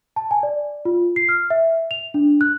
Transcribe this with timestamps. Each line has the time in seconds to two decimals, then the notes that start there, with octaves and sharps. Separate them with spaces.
0.16 A5
0.31 G#5
0.43 D5
0.85 F4
1.16 C7
1.29 F6
1.50 E5
1.91 F7
2.14 D4
2.41 F#6